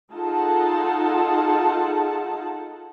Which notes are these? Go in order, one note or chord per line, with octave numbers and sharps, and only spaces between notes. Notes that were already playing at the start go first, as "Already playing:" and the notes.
D#4 F4 G#4 A4 F#5 A5